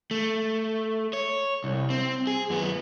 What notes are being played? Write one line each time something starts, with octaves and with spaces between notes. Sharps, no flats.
A3
C#5
C2
C4
G#4
F#2 B3